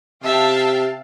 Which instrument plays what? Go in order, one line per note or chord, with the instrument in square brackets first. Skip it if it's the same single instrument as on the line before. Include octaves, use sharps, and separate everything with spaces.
[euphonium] C3 [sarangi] E5 [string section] F5 G5 A5